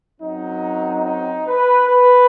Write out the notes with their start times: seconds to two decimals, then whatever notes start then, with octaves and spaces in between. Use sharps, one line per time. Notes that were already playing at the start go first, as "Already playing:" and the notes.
0.21 F#2 F#3 C4 D#4
1.05 D#4
1.47 B4
1.89 B4